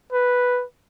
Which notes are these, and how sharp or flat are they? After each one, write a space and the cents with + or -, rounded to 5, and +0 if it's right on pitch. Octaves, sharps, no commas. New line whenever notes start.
B4 +0